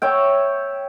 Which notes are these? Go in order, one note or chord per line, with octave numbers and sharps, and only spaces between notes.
C#5 E5 G5